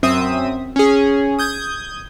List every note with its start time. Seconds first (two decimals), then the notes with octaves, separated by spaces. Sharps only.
0.03 F#2 C4 E5 D#6
0.76 C#4 G#4
1.39 D#6 G6 G#6